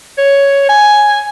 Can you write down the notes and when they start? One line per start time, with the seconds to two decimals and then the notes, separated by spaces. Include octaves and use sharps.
0.18 C#5
0.69 G#5